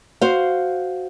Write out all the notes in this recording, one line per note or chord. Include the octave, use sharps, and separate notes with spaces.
F#4 C5 F5